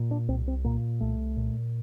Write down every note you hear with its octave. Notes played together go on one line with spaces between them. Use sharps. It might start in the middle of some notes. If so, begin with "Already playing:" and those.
Already playing: A#2
D4
C2 C4
C4
A#2 A#3
C2 A3
A#2